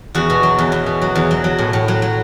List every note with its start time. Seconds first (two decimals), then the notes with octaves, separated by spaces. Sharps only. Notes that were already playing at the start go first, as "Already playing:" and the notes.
0.15 E2 F#4
0.30 B2
0.43 F#3
0.59 E2
0.72 E2
0.86 B2
1.02 F#3
1.15 E2
1.31 F#3
1.44 F#3
1.58 A2
1.73 A2
1.88 F#3
2.02 F#3